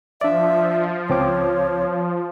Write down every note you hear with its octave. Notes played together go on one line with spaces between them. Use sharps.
F3 D4 D5 E5
C#2 C4 C#5 D6